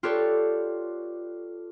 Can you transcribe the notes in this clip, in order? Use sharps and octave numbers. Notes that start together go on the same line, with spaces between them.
F4 G4 A4 B4 C#5 D5